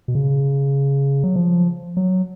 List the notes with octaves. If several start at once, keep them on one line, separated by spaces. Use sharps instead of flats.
B2
C#3
F#3
F3
F#3